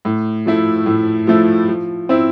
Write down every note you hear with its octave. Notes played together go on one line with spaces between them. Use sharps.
A2
F3 A3 E4
A2
F3 A3 E4
F3
C4 E4